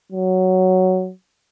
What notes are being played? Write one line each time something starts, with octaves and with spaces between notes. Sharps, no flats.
F#3